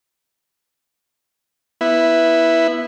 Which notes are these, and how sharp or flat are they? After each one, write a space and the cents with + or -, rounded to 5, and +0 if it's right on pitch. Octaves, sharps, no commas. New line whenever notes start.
B3 -5 E4 +0